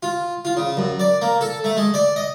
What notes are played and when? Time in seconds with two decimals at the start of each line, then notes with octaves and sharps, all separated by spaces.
0.03 F4
0.45 F4
0.57 C#3
0.77 F#2
1.00 D5
1.22 A#3
1.41 A4
1.64 A3
1.77 G#3
1.94 D5
2.16 D#5